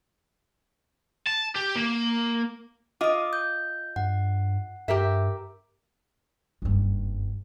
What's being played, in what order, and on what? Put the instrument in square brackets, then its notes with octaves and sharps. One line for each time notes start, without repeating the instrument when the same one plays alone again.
[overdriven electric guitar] A5
G4
A#3
[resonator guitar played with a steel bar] F4 D#5 [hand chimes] D6 D#6
[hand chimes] G6
[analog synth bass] G2 [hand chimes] F#5
[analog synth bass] G2 [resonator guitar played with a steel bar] G4 A#4 E5
[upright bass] F#1 G2